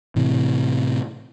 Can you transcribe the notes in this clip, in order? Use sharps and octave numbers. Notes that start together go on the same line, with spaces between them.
A2 C3 E3